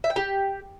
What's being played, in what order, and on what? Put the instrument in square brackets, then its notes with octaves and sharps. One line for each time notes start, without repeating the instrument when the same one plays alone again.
[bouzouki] E5
G5
G4